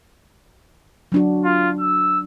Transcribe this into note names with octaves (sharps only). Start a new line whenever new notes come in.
F#3 D4 F#4
F4
E6